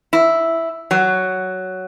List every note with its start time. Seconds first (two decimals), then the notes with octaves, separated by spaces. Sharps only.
0.13 E4
0.91 F#3